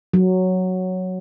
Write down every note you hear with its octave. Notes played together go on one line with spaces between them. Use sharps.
F#3